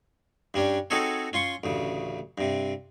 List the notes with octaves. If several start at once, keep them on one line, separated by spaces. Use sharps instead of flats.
G2 G3 C#4 D4
C4 D#4 F#4 G#4 A4 C#5
C#4 F4 C6 C#6
A1 D2 C#3
G2 C3